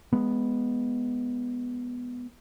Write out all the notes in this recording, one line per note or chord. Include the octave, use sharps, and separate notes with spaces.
G#3 B3